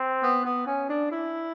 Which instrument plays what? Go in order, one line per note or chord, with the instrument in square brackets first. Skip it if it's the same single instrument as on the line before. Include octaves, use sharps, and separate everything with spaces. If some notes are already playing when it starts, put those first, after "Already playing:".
Already playing: [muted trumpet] C4
[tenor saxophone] B3
B3
C#4
D4
E4